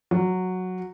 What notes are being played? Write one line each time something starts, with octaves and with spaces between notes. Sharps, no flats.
F#3